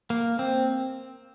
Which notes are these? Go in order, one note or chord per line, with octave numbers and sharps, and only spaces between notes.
A#3
C4